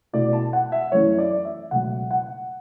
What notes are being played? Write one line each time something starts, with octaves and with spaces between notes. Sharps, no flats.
B2 A3 E4 D5
A5
F#5
E5
F#2 E3 A3 C#4 E4 C#5
D5
E5
C#2 B2 F#3 A3 F#5
F#5